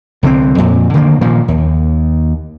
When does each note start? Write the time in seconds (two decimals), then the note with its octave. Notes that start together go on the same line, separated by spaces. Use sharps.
0.23 C2 D3 G3 C4
0.58 F2 A#2
0.94 D3 D#3 G#3 A#3
1.21 A#2 D#3 F3
1.48 D#2